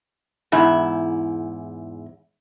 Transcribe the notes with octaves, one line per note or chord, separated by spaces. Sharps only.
E2 G#2 E4